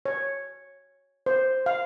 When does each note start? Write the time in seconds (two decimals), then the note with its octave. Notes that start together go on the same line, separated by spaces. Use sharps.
0.05 C#5
1.26 C5
1.66 F5